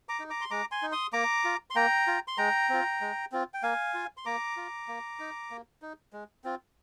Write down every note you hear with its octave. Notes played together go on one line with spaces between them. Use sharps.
A#5 D6
D#4
A#5 D6
C6
G#3 A#5 D6
G#5 C6
D#4
C6 D#6
A#3 A#5 D6
F4
C6
A#3 G5 A#5
F4
C6
G#3 G5 A#5
C4 F4
G#3
C4 F4
G5
A#3 F5 G#5
F4
C6
A#3 A#5 D6
F4
A#3
D#4
A#3
D#4
G#3
C4 F4